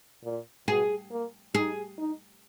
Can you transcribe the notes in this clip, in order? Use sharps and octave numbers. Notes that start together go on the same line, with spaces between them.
A#2
B2 G#4
A#3
D#4 G#4
D#4